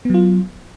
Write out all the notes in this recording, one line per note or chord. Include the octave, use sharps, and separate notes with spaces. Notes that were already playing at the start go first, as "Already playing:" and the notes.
F#3 B3 F4